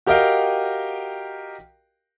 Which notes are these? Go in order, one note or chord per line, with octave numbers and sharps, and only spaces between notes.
F#4 G4 A#4 D#5 F5 G5